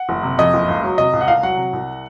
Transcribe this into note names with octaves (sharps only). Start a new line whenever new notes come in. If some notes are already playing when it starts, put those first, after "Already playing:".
Already playing: F#5
F#1
C3
F2 D#5
F#1
C#2
F#3
C3 D#5
C#2
F#5
C2 F5
F#3 F#5
C3
C2